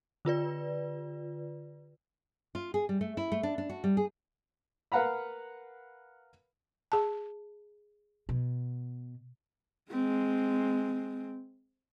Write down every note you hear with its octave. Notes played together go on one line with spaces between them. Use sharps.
D3 F4 B4 D5
F4
G#4
G3
A3
E4
A3
D4
D4
F#4
G3
G#4
A#4 B4 F5 F#5 A#5 B5
G#4 A5
B2
G#3 C4